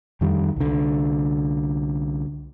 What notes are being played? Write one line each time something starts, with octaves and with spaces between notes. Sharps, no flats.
F2 D#3 G3
C2 D3